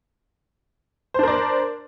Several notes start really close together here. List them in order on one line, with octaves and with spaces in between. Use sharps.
C5 D4 A#4 D5